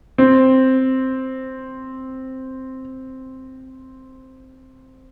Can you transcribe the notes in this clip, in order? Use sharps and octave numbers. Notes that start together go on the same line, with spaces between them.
C4